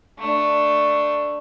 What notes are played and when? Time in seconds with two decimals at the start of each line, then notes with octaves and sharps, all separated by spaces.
0.19 A3 D4